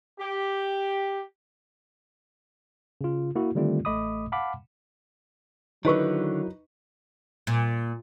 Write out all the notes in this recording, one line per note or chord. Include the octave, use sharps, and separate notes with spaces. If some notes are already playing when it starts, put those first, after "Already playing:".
G4
C#3 F4
A#3 E4 F#4
D3 D#3 G3 A3 C4 F4
A1 A3 D#5 B5 D6 D#6
F5 F#5 A5 B5 D6
D3 D#3 F#3 D#4 E4 A#4 B4 C#6
A#2